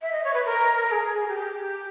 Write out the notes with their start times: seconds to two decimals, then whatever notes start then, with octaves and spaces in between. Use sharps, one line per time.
0.01 E5
0.12 D#5
0.23 C#5
0.33 B4
0.45 A#4
0.86 A#4
0.91 G#4
1.27 G4